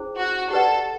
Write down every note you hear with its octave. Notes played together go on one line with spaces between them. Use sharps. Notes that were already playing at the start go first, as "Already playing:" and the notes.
Already playing: C#4 E4 G#4 C5
F#4
G4 A4 B4 D5 F#5